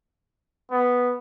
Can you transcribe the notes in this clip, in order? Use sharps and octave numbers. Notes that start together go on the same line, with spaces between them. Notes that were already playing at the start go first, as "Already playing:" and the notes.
B3